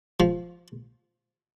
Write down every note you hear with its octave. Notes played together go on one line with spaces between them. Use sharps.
F3